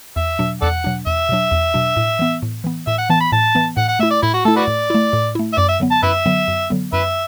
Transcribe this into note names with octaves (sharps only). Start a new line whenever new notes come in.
E2 E5
B2 F#3 D4
E2 A4 D5 F#5
B2 F#3 D4
E2 E5
B2 F#3 D4
E2
B2 F#3 D4
A2
E3 B3
A2
E3 B3
A2 E5
F#5
E3 B3 A5
B5
A2 A5
E3 B3
A2 F#5
F#5
A3 E4 E5
D5
A2 E4
F#4
A3 E4 A4
F#4 B4 D5
A2
A3 E4
A2
A3 E4
E5
F#2 D5
E5
D3 F#3 B3
A5
F#2 B4 E5
D3 F#3 B3
F#2
D3 F#3 B3
F#2 B4 E5